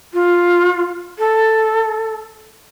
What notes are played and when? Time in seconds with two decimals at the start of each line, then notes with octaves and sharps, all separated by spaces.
0.14 F4
1.19 A4